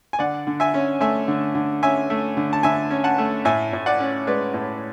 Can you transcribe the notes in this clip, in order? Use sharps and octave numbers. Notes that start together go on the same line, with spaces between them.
G#5
D3 D5 F#5
D3
E5 G#5
C#4
A3 E5 G#5
D3
D3
C#4 E5 G#5
A3
D3
A5
D3 E5 G#5
C#4
F#5 A5
A3
A2 E5 G#5
A2
D5 F#5
C#4
G#3 B4 D5
A2